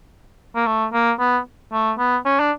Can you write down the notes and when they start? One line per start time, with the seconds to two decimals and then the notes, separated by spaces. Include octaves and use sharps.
0.56 A#3
0.67 A3
0.93 A#3
1.20 B3
1.73 A3
1.99 B3
2.25 C#4
2.40 D4